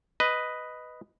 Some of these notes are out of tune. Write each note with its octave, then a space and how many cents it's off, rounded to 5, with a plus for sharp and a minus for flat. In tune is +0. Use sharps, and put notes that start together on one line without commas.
B4 +5 D#5 +0